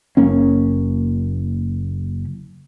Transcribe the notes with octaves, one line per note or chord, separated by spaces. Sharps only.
F#1 A#3 C#4